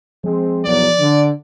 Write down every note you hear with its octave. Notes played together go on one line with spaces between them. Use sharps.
F3 G#3 C4
B1 E2 F#3 D5
D3